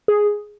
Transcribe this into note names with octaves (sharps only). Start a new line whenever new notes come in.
G#4